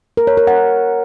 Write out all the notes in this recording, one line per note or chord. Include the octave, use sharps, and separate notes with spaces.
A#4
C#5
A#4
F#5